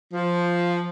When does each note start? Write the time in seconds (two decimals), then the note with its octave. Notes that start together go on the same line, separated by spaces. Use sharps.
0.13 F3